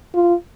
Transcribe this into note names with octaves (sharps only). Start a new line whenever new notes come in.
F4